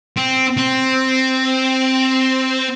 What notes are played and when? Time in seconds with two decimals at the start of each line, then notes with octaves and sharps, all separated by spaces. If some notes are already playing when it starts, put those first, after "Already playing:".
0.17 C4
0.57 C4